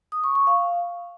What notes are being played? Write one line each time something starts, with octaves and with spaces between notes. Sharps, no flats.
D#6
C#6
C#6
F5